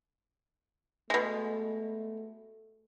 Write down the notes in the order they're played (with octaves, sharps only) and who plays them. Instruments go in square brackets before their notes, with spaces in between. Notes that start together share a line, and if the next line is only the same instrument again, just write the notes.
[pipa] B2 G#3 [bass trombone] A3